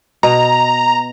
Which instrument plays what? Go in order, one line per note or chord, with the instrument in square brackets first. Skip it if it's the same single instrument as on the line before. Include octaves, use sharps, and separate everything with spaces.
[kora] B2 [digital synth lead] A#5